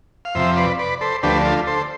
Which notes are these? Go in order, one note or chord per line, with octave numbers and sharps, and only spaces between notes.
F5
F2 C3 F3 C5 E5
B4 D5
B4 D5
A4 C5
D2 D3 F3 A3 D4 G4 B4
F4 A4
A4 C5